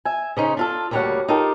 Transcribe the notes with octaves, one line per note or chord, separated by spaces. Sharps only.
E5 G#5
C#3 C#4 D#4 C5
D4 F4 A4
D2 C#3 G3 A#3 C#5 F#5
D#4 F4 G4 A4 A#4